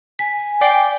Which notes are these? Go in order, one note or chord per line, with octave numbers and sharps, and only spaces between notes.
G#5 B6
D5 G5 C7 D7